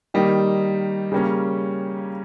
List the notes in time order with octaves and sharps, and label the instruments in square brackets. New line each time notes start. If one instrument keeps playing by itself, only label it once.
[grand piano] D#3 G3 A#3 D#4
C#3 G3 A#3 C#4